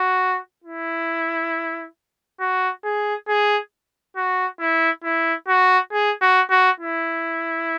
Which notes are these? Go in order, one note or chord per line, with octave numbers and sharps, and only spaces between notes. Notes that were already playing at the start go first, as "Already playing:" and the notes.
Already playing: F#4
E4
F#4
G#4
G#4
F#4
E4
E4
F#4
G#4
F#4
F#4
E4